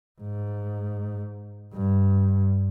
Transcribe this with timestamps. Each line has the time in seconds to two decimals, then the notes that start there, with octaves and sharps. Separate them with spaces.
0.21 G#2
1.74 G2